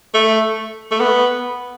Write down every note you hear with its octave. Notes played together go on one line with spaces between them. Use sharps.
A3
A3
B3